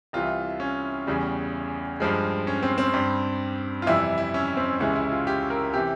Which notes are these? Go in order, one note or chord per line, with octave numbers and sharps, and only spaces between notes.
C2 C3 E3 F4
C#4
E2 C#3 G3
G2 F3 G#3
C#4
C4
C4
G2 G3
F4
F2 C3 E3 G3 E4
E4
C#4
C4
C#2 C3 E3 G#3 C#4
E4
F4
G4
A#4
C3 E3 G4